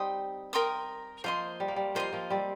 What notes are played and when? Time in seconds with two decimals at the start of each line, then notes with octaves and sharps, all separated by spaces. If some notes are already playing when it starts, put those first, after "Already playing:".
Already playing: G3 C4 D#4 G5 C6 D#6
0.53 A#4 G5 C6 D#6
1.24 F3 A#3 C5 D#5 C6
1.60 G3
1.68 A#3
1.76 G3
1.95 F3 A#3 C5 D#5 C6
2.13 F3 A#3
2.30 G3 C4